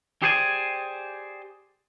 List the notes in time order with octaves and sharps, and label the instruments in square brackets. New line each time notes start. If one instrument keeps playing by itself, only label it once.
[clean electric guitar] G4 G#4 C5 D5 G#5